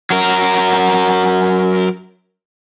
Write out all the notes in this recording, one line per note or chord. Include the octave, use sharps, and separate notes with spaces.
F#3 A#4